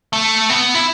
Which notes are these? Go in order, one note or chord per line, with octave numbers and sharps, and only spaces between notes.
A3
B3
E4